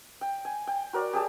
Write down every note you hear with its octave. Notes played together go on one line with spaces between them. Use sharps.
G5
G#5
G5
F#4 A#4 C#5 D5
G4 G#4 G5 A5